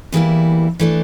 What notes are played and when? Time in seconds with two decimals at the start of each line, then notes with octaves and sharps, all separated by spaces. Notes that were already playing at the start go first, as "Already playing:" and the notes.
0.12 E2 E3 G3 A#3 E4
0.79 E3 A3 D4